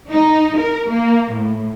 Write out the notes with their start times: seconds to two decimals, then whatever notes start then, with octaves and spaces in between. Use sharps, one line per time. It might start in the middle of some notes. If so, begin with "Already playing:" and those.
0.10 D#4
0.59 A#4
0.90 A#3
1.33 A2